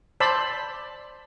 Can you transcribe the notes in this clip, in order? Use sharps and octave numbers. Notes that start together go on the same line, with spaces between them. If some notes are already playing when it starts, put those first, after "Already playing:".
C5 D5 A5 B5 C6 E6